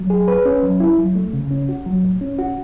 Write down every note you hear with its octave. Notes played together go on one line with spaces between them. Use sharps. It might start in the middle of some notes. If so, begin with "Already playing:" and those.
Already playing: F#3
G#4
B4
C#4
F#3
E4
F#3
A3
C#3
C#4
F#4
F#3
A2
C#4
F#4